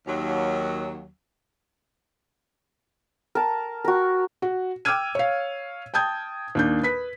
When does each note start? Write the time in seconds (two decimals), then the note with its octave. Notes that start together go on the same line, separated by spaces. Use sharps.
0.07 D#2 F#3
3.35 A#4 A5
3.85 F#4 A#4
4.42 F#4
4.85 G5 D6 E6 F6 G#6 D#7
5.15 C#5 F5
5.94 G5 A5 D#6 G6 G#6
6.55 D#2 D4 G6
6.83 B4 B6